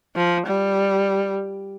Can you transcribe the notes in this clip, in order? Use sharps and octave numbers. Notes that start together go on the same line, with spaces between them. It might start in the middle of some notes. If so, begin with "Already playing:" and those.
F3
G3